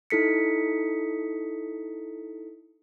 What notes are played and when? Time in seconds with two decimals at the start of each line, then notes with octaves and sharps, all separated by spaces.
0.10 D#4 E4 A4 B6 C#7